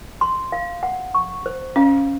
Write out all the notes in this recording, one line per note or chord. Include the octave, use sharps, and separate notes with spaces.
C6
F5
F#5
C#6
C5
C#4 F5